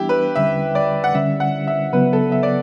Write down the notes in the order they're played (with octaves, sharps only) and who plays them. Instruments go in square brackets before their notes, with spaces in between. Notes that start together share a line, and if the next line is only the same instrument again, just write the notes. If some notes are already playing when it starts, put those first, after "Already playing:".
Already playing: [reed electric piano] E3 G3 B3 D4 [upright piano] E4 G4
[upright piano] B4
[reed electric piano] E2 D3 G3 C#4 [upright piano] E5
[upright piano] D5
F#5
[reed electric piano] D3 G3 C#4 [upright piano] E5
[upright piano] F#5
E5
[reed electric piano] C#3 F#3 B3 [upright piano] B4
[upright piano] A4
E5
D5